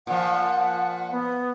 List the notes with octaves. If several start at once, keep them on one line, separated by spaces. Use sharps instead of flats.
A#2 F3 F#5
B3